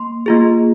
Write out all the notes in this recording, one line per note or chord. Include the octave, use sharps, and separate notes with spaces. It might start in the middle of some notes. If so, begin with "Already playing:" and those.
Already playing: A#3 C6
A#3 F4 G#4